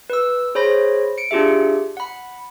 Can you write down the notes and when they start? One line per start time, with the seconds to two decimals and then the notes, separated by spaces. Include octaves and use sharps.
0.10 B4 E6
0.55 G#4 C5 C#5 B5 A#6
1.18 C#7 D7
1.31 D4 F4 G4 G#4 E5
1.97 F#5 B5